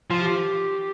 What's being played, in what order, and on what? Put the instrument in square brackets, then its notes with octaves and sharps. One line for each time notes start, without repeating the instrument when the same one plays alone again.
[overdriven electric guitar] F3 [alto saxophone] F4
[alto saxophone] G4